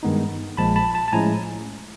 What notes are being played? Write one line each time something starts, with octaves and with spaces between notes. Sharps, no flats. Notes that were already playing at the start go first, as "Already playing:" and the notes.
G2 D#3 G#3 B3 D#4
A#1 A#2 F3 G#3 A5 B5
A5 B5
A5 B5
A5
A2 F3 G#3 C#4 E4 G#5 A#5